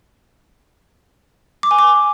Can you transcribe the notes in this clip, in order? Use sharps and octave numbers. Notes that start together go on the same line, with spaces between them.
D6
G#5
D6